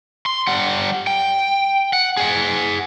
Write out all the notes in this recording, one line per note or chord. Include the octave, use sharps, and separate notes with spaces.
C6
G3 F#5
G5
F#5
G#4 F#5